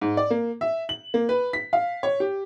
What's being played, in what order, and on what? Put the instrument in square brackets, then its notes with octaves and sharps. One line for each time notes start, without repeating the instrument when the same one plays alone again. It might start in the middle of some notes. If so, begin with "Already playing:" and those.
[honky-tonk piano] G#2
D5
A#3
E5
F#7
A#3
B4
B6
F5
C#5
G4